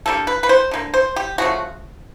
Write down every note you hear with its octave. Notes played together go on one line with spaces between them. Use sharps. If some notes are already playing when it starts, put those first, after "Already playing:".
D3 G3 A#3 A4
B4
B4
C5
D3 G3 A#3
C5
G4
C#3 F3 A3 F#4